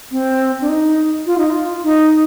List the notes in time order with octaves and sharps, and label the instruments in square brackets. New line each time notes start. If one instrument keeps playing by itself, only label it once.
[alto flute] C4
D4
D#4
F4
D#4
F4
D#4